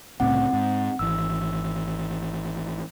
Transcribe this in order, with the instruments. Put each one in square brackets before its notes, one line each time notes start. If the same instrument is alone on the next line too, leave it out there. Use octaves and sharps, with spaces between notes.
[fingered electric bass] C2 A2 C#3 [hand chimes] C4 F#5
[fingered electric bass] G#2
[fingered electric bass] G#1 E3 [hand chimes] E6